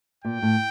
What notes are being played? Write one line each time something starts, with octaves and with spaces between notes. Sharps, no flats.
A#2 G5
A2